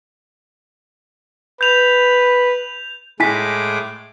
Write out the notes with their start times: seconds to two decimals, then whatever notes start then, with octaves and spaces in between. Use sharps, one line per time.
1.61 B4 G6 F7
3.20 A2 G#3 E4 G#5 D6 B6